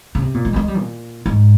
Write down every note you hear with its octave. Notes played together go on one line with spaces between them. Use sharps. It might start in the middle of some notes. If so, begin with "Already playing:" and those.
C#3
C3
A#2
G#3
G3
G#3
G3
A#2
G#2